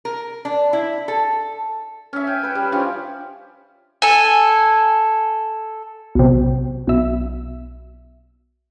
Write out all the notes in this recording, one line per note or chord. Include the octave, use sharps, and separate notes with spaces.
A#4
D4
E4
A4
C#4 E5
G5 G#5
B4 G5
G3
F3 C#4 D4 G4
A4 G#5
B1 C3
B1 E5